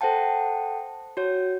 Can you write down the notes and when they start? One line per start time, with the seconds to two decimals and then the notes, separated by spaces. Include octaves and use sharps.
0.01 A4 C5 F#5 G5 A5
1.17 F#4 C#5